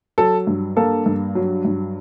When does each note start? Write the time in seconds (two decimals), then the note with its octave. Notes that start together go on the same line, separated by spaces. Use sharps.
0.18 F#3 A4
0.47 G2
0.77 A#3 A4
1.06 G2
1.35 F#3
1.65 G2